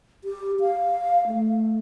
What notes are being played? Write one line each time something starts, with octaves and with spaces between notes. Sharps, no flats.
G4
F5
A3